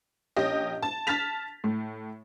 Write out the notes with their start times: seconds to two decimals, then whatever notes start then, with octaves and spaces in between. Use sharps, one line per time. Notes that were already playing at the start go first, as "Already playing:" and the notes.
0.37 A#1 C#4 G4 D#5
0.83 A5
1.07 A5 F6 A6 B6 F7
1.64 A2